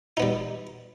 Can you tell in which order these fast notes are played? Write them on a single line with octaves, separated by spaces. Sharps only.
D#4 B3 G3